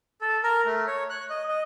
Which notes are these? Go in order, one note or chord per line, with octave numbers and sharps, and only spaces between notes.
A4
A#4
A3
C#5
F#6
D#5
D#5